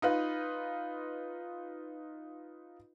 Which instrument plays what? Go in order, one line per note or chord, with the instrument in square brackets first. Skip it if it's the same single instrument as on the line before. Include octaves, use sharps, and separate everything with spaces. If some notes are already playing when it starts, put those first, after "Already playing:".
[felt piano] D#4 F4 B4